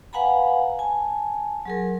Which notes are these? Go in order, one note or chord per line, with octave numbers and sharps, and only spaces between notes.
B4 F5 F#5 G#5 A#5 B5
G#5 A5
F#3 G#4 A#4